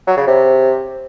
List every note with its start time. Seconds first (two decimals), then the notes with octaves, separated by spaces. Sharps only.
0.07 F#3
0.17 C#3
0.27 C3